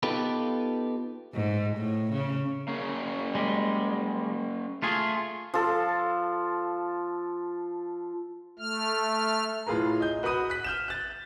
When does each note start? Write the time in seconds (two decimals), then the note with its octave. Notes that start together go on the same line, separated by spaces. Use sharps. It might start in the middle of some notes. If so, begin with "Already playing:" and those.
0.03 B3 D#4 F4 G4 A4 B4
1.35 G#2
1.77 A2
2.13 C#3
2.68 A#3 C#4 G#4
3.35 G3 G#3
4.82 A3 F4 G#4
5.54 F3 A4
8.59 A3 F6
9.67 A2 F4 G#4 B4 A#5
10.00 D#5 G6
10.23 F#4 B4 F#5 B5 D#6 D#7
10.50 F#6 B6
10.64 F6 G6 E7
10.88 F#6 A6